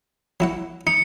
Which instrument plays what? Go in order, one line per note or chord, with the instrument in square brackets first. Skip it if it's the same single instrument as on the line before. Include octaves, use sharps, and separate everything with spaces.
[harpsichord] F#3 E4 F#5
[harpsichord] D#4 [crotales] C#7